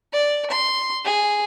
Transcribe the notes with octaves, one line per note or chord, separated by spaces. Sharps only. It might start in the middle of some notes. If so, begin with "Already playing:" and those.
D5
C6
G#4